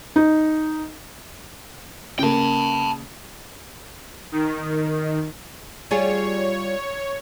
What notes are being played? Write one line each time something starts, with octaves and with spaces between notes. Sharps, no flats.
D#4
C#3 A#3 G5 A5
D#3
G3 F4 G#4 C#5